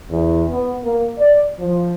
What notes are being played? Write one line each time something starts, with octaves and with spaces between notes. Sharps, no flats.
E2
B3
A#3
D5
F3